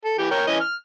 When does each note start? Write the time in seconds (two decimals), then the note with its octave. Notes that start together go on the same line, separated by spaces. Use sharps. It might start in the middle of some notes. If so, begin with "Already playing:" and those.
0.05 A4
0.18 E3 G4
0.31 A#4 C#5 G5
0.47 E3 C#4 D#5
0.60 F6